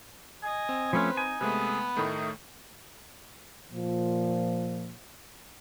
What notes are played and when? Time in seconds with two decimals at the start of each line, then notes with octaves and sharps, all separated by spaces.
0.43 D#5 G#5
0.69 C4
0.93 F3 A3 C#4 B4 C5
1.17 D#4 G#5
1.41 C3 G#3 A3 B3 G#4 B4
1.97 A2 D#3 A3 D#4
3.72 A#2 F3